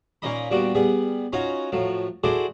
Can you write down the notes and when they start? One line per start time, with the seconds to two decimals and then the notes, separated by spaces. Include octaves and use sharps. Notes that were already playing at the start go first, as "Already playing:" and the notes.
0.22 A#2 A#3 C#4 D#4 D#5 B5
0.51 A#2 G3 B3 D4 F#4
0.75 G3 B3 G#4
1.33 C#4 D#4 F4 F#4 C#5
1.72 A2 F3 F#3
2.23 E4 F#4 G#4 A4 C5 D5